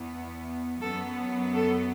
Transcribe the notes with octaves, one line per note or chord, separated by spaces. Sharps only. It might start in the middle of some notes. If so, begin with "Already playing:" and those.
Already playing: E2 E3 B3
F#2 F#3 B3 A4
A4